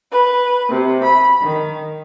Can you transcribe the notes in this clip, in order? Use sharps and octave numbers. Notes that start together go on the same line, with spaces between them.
B4
C3
B5
D#3